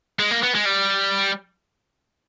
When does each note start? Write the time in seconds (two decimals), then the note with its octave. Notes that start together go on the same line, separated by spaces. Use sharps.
0.19 G#3
0.31 A#3
0.43 B3
0.54 G#3
0.65 G3